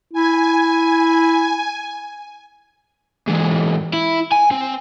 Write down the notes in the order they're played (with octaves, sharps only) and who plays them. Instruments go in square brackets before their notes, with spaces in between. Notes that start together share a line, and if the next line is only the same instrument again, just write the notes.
[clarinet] E4 [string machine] G#5
[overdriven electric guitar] G#2 E3
E4
G#5
C4